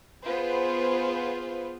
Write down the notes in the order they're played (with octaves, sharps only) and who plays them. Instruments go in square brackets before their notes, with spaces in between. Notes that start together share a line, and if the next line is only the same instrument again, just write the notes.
[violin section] B3 F4 G#4 B4 C5